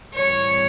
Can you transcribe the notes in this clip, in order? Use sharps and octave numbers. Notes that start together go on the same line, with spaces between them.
A2 E3 G3 C4 C#5